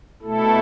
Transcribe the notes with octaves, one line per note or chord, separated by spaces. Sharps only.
B2 A3 E4 A4